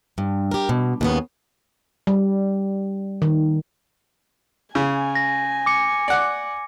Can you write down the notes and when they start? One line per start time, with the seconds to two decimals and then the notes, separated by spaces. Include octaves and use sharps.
0.18 G2
0.51 G4 A#4
0.69 B2
1.01 D#2 C#3 B3
2.07 G3
3.22 D#3
4.75 C#3 G#5
5.15 A#6
5.66 D6 C#7
6.08 D5 F#5